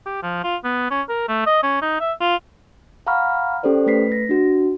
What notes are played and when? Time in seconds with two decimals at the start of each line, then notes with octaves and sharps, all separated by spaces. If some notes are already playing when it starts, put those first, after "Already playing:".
0.06 G4
0.23 F3
0.44 F4
0.64 B3
0.91 C#4
1.09 A#4
1.29 A3
1.47 D#5
1.63 C#4
1.82 D#4
2.00 E5
2.20 F4
3.07 F5 F#5 A#5 B5 C#6 F6
3.63 C#4 G4 A4 C5 D5
3.86 A3 B4 B6 C7
4.12 A#6
4.29 D4 F#4